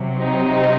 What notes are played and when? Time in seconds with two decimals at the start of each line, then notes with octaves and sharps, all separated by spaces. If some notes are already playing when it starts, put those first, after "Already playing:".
Already playing: C3 F#3
0.18 C4 D#4